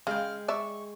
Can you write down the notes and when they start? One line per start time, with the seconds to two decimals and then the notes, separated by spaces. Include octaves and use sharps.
0.07 C#3 G#3 G5 F6
0.48 D5 E5 C#6